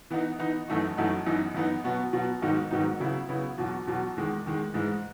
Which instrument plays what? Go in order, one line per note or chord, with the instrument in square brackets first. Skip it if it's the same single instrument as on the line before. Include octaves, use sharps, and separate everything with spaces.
[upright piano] E3 B3 D#4
E3 B3 D#4
F#2 E3 A3 D#4 F#4
F#2 E3 A3 D#4 F#4
F#2 E3 B3 D#4
F#2 E3 B3 D#4
B2 F#3 B3 F#4
B2 F#3 B3 F#4
G#2 D#3 F#3 B3 D#4
G#2 D#3 F#3 B3 D#4
C#3 F#3 B3 E4
C#3 F#3 B3 E4
E2 B2 F#3
E2 B2 F#3
E2 D#3 G#3
E2 D#3 G#3
G#2 E3 G#3